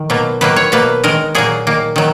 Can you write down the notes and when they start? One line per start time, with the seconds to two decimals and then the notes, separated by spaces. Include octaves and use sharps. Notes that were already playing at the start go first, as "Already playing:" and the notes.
Already playing: D#3
0.10 B2 F#3 A#3
0.41 D#3 F#3 A#3 B4
0.56 C#5
0.72 B2 F#3 A#3 B4
1.04 D#3 G#3 A#4
1.35 A#2 F#3 A#3 G#4
1.67 D#3 A#3
1.96 D#3 F#3